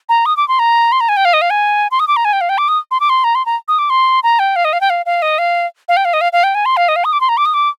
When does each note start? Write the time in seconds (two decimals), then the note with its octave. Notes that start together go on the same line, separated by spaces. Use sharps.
0.09 A#5
0.26 D#6
0.37 D6
0.48 C6
0.59 A#5
0.92 C6
1.00 A#5
1.09 G#5
1.17 G5
1.25 F5
1.33 D#5
1.42 F5
1.50 G#5
1.91 C6
2.00 D#6
2.08 D6
2.16 A#5
2.25 G#5
2.33 G5
2.41 F5
2.49 G5
2.58 D6
2.68 D#6
2.91 C6
3.00 D6
3.09 C6
3.24 A#5
3.35 C6
3.46 A#5
3.68 D#6
3.79 D6
3.90 C6
4.23 A#5
4.39 G5
4.56 F5
4.65 D#5
4.73 F5
4.81 G5
4.90 F5
5.06 F5
5.22 D#5
5.38 F5
5.89 F5
5.97 G5
6.05 F5
6.13 D#5
6.21 F5
6.33 F5
6.44 G5
6.55 G#5
6.66 C6
6.77 F5
6.88 D#5
6.96 F5
7.05 D#6
7.13 D6
7.21 C6
7.29 A#5
7.37 D6
7.46 D#6
7.54 D6